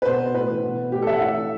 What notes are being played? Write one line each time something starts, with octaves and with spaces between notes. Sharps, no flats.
B4
B2 C5
A2 B4
E3
B2
A2 G4
A4
E3 E5
F#5
A2 E5
E3